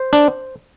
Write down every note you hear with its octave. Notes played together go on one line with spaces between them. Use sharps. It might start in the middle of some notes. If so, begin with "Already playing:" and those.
Already playing: C5
D4